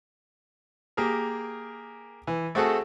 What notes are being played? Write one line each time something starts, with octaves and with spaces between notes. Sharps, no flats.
A#3 G4 G#4 A#4
E3
A3 C4 F#4 G#4 A4 F#5